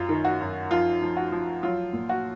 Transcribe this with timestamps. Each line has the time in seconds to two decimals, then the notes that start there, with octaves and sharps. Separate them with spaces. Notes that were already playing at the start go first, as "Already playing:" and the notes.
Already playing: F#2 F4
0.09 D#3
0.25 F#4
0.41 F#2
0.71 F3 F4
1.02 F3
1.17 F#4
1.32 F3
1.63 F#3 F4
1.93 A#2
2.09 F#4